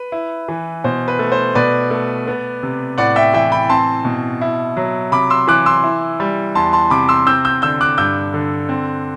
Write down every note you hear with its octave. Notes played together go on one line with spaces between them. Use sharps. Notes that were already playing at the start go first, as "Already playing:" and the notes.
Already playing: B4
E4
E3
B2 C5
B4
A3
C5
B2 B4 D5
A3
B3
C3
A2 D5 F#5
E5 G5
E3 E5 G5
G5 B5
C4 A5 C6
B2
E4
F#3
C3 B5 D6
C6 E6
E3 D6 F#6
C6 E6
E4
G3
E2 A5 C6
A5 C6
C3 B5 D6
C6 E6
C4 E6 G6
E6 G6
D3 E6 G6
D6 F#6
G2 E6 G6
D3
C4